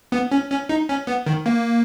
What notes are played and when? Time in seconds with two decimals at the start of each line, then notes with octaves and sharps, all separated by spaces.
0.12 B3
0.31 C#4
0.50 C#4
0.69 D#4
0.89 C#4
1.07 B3
1.26 D#3
1.46 A#3